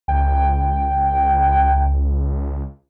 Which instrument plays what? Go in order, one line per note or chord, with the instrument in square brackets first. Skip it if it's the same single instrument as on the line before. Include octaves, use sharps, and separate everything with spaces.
[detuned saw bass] C#2 [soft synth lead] G5